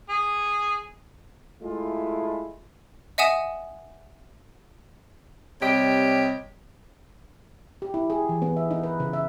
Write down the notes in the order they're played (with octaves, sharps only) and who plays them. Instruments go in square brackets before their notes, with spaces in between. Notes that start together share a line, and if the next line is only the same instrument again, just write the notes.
[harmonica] G#4
[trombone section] G#3 A3 E4 F4
[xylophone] D#5 E5 F#5 G#5 D#6 E7
[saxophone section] C3 G3 G4 C#5 D#5
[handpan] G4
E4
G#4
E3
B3
E5
D#4
B4
C#3
E5